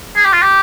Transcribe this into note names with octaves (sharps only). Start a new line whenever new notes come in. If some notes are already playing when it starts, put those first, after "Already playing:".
G#4
G4
F4
G4